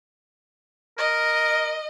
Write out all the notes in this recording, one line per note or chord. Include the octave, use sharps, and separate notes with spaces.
A#4 D#5